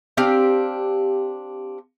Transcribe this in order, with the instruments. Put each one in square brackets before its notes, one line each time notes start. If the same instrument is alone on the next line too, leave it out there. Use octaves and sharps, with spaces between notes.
[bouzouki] C4 D4 G4 F5